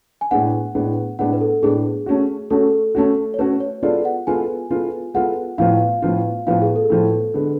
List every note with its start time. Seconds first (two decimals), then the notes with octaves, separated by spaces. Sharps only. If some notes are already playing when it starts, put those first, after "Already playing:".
0.21 G#5
0.31 A2 G#3 B3 D4 F#5
0.75 A2 G#3 B3 D4
1.19 A2 G#3 B3 D4 F#5
1.33 B4
1.41 A4
1.62 A2 G#3 B3 D4 G#4
2.06 A3 C#4 F#4
2.50 A3 C#4 F#4 A4
2.95 A3 C#4 F#4
3.34 C#5
3.39 A3 C#4 F#4 B4
3.60 C#5
3.83 G#3 B3 F4 A4 D5
4.05 F#5
4.27 G#3 B3 F4 A4 G#5
4.70 G#3 B3 F4 A4
5.14 G#3 B3 F4 A4 F#5
5.58 A2 F3 B3 F4 F5
6.02 A2 F3 B3 F4
6.47 A2 F3 B3 F4 F5
6.61 G#4
6.76 A4
6.90 A2 F3 B3 F4
7.34 D3 G#3 B3